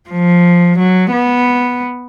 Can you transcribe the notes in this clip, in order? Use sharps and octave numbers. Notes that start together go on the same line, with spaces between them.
F3
F#3
B3